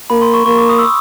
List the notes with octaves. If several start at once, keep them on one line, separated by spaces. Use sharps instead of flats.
A#3 B5
C6
C#6
A#3 C#6
D6
D#6
E6